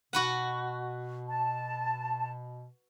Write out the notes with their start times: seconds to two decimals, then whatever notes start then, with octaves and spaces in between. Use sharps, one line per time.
0.13 B2 F#4 B4 F#5
1.28 A5